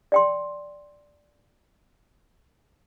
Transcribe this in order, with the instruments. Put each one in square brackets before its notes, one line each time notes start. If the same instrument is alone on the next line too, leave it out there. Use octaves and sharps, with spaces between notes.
[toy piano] D5 G5 C6